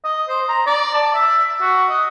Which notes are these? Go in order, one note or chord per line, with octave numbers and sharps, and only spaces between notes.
D#5
C5
A#5
D5
A5
E5
F#4
D#5